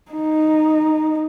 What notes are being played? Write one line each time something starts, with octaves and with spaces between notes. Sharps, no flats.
D#4